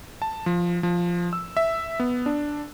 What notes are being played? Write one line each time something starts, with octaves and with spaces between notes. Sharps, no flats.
A5
F3
F3
E6
E5
B3
D4